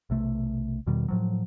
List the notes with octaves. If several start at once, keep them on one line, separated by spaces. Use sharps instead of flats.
B1 C3 A3
E2 B2 D#3 G3
A2 F3 F#3